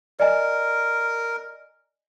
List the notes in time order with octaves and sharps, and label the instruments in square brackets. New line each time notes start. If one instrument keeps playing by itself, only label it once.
[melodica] A#4 [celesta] D5 D#5 G#5